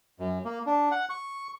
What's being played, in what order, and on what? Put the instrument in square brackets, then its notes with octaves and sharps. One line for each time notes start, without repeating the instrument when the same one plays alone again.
[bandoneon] F#2
A#3
D4
F#5
C#6